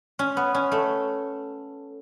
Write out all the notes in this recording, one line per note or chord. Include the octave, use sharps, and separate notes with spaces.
C#4
B3
C#4
A3